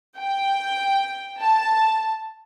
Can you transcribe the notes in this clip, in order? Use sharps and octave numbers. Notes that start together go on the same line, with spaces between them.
G5
A5